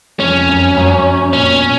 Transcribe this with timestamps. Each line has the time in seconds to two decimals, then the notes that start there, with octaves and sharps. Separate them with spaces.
0.20 F2 C#4
0.49 F#2
0.77 F#2
1.33 A#2 C#4
1.52 B2